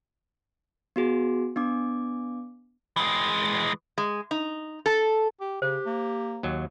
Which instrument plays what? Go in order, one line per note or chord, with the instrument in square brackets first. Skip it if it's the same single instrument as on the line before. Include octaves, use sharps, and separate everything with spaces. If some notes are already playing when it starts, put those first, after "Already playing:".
[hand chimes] B3 F#4 G#4
B3 D4 D6
[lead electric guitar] E3 G#3
[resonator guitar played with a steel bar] G#3
D#4
A4
[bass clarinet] G4
[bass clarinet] C#3 [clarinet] G4 [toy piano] C5
[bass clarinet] A#3
[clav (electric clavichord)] D#2 F#3